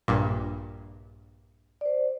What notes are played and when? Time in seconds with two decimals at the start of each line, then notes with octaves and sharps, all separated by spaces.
0.08 A#1 G2 A#2
1.81 C5 D5